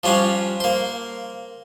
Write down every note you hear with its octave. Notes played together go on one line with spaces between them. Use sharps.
F3 G3 C#4 D4 F4
A#3 C5